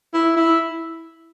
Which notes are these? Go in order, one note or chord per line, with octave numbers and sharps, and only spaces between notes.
E4
E4